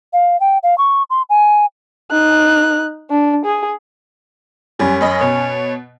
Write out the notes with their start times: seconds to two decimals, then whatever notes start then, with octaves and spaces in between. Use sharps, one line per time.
0.13 F5
0.40 G5
0.63 F5
0.78 C#6
1.10 C6
1.29 G#5
2.11 D#4 F#6
3.10 D4
3.45 G#4
4.79 F#2 G3 C#4
5.01 F#2 D#5 B5
5.21 B2 C#5